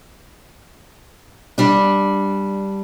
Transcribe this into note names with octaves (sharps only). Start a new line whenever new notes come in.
G3 D4